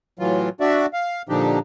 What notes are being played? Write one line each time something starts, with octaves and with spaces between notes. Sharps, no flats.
A2 E3 F#3 F4
D4 F#4 D5 E5
F5
A#2 D3 F3 D4 D#4 G4